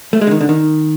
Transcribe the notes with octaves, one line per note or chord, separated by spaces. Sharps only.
A3
G#3
D3
D#3
D3
D#3